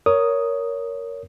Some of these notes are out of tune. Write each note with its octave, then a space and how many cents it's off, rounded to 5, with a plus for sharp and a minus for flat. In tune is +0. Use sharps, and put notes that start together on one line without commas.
A#4 +0 C#5 +15 D#6 +0